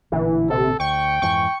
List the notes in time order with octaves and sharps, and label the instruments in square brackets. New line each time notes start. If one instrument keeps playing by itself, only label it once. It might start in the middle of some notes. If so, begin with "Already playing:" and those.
[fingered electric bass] A1 A#2 D3 [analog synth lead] E3
[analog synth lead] C3 [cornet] A4
[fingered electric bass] D2 [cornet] G5 [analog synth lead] C#6
[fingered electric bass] F2 G#2 E3 [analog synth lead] C#6